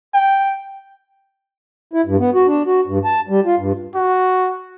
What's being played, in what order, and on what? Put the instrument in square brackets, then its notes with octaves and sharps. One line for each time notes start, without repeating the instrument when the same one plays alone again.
[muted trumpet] G5
[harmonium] E4
G2
B3
F#4
D4
F#4
G2
A5
G3
F4
G2
[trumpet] F#4